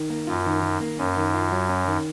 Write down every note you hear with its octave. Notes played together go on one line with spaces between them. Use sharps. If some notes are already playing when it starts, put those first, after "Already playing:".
Already playing: D#3
A#3
F#2 F4
D#3
D#3
A#3
F#2 C#4
D#3
F4
F#3
C#4
D#3